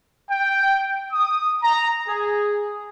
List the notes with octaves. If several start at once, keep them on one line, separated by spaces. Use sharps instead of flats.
G5
D#6
A#5
G#4